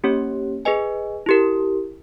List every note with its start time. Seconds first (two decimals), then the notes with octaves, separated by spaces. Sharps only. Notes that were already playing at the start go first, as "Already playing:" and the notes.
0.04 A#3 C#4 G4 C#5
0.65 G#4 B4 D#5 G#5
1.26 E4 G4 A#4